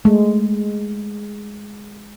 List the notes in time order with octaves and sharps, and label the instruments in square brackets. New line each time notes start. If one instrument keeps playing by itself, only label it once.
[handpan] G#3 [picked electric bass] A3